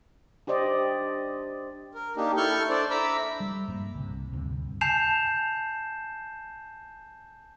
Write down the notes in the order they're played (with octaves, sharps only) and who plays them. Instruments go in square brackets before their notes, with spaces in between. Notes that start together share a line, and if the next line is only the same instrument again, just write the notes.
[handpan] D4 G4 C5 D5 D#5
[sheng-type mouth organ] A#4
A#3 D4 D#4 G4
E4 A4 C#6 F6 G6
D4 A4 C5 D5
E5 A#5 B5 D6 E6
[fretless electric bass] G3
G2 A3 A#3
C2 C3
D2 G2 C3
[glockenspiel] G#5 A5 G6 C7 E7 F7